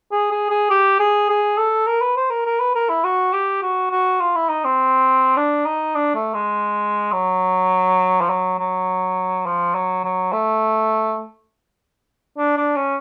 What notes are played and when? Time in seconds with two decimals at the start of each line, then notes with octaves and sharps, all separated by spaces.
0.12 G#4
0.31 G#4
0.50 G#4
0.70 G4
1.00 G#4
1.29 G#4
1.58 A4
1.87 A#4
2.01 B4
2.16 C5
2.30 A#4
2.45 A#4
2.60 B4
2.75 A#4
2.89 E4
3.04 F#4
3.33 G4
3.62 F#4
3.91 F#4
4.20 F4
4.35 E4
4.49 D#4
4.64 C4
5.37 D4
5.66 D#4
5.95 D4
6.15 A3
6.34 G#3
7.12 F#3
8.21 F3
8.30 F#3
8.59 F#3
9.46 F3
9.75 F#3
10.04 F#3
10.33 A3
12.37 D4
12.57 D4
12.76 C#4